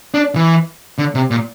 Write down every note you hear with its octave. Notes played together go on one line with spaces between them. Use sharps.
D4
E3
D3
C3
A#2